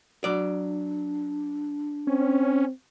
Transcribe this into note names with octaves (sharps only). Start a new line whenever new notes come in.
F#3 D4 D5
C4 C#4